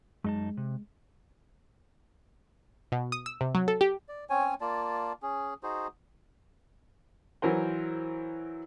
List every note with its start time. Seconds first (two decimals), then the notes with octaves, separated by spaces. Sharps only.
0.24 F#2 G#3 D#4 A5
0.57 C3
2.92 B2
3.12 D#6
3.26 E6
3.41 C3
3.55 F#3
3.68 A4
3.81 G4
4.08 D5
4.30 C4 C#4 C#5 G#5
4.61 A#3 F4 D5 A5
5.23 C#4 G#4
5.63 D#4 F#4 G#4 C5
7.42 E3 F#3 A#4 C5